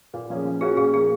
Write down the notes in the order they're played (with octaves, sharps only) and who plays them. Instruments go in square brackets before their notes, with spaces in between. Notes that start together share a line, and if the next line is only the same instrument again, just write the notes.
[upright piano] A#2
F3 A#3 C#4 G#4
F3
[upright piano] A#3 C#4 F#4 [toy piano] G#4
[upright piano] A#2 [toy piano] G#4
[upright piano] F3 A#3 [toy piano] G#4